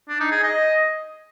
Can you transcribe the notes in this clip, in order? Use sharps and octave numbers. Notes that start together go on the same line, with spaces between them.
D4
D#4
G#4
D#5